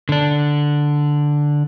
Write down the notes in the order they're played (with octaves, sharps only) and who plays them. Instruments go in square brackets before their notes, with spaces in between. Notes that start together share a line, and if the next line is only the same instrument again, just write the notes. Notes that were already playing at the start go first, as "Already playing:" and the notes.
[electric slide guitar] D3 D4